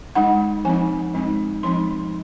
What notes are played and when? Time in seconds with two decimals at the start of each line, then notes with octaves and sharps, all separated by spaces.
0.15 G#3 D#4 F#5
0.65 F3 C4 D#4 G#5
1.14 G#3 C4 D#4
1.63 F3 G#3 C4 D#4 C6